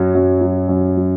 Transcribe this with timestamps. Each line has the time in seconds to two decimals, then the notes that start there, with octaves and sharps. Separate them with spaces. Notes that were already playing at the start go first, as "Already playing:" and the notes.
Already playing: F#2 F#3
0.15 F#2
0.41 F#3
0.69 F#2
0.97 F#3